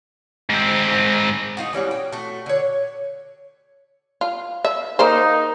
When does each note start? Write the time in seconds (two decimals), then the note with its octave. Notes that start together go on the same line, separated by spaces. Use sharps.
0.50 G#2 C4
1.57 D#4 F4 F#4
1.73 E3 G3 C#4 F#4
1.91 G5
2.12 A3 F#4
2.46 D3 C#5
4.21 F4
4.64 E5
4.99 A#3 D#4 A#4 C5